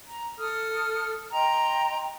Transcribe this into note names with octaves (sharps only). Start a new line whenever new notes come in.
A#5
A4 D#6 F6
D#5 G5 A#5 C6